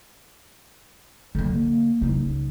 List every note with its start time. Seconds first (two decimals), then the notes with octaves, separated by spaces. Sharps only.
1.35 D3 A#3
2.01 C#2 D#4